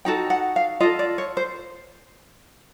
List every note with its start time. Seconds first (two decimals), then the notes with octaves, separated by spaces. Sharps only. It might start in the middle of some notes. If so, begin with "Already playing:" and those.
0.05 D#4 F#4 A4 G5
0.30 F#5
0.56 F5
0.80 F4 D#5
0.83 A4
0.99 D5
1.18 C#5
1.37 C5